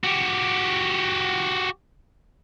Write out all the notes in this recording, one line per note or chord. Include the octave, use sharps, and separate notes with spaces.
F#4 G4